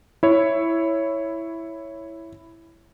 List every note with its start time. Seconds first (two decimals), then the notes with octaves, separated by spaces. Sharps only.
0.23 E4 C#5